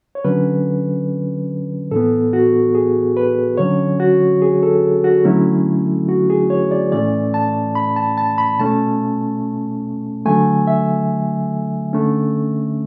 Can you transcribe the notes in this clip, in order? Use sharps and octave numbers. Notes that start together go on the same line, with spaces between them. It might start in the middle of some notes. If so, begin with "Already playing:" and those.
C#5
D3 F#3 C#4 B4
A2 E3 B3 A4
F#4
G#4
B4
D3 F#3 C#4 C#5
F#4
G#4
A4
F#4
D3 F#3 A3 C#4 E4
F#4
G#4
C#5
D5
A2 E3 A3 C#4 D5
A5
B5
A5
A5
B5
B2 A3 C#4 A5
D3 F#3 A3 G#5
E5
D3 A3 C#4